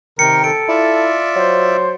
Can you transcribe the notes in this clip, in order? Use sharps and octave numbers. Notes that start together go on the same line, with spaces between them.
C3 D#3 A#4 G5 C#7
A4 D7
E4 F4 D5 E5
F#3 C5